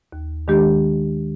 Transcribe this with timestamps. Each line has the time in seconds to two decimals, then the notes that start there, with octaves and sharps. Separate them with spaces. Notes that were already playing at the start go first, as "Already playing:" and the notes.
0.12 D#2
0.48 D#3 G#3 D4 G4